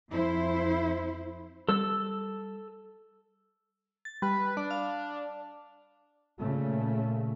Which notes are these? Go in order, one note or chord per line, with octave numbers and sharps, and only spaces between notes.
F2 E4 C5
G3 A4 E6
A6
G3 B4
D4 D5
F5
A#2 C#3 A3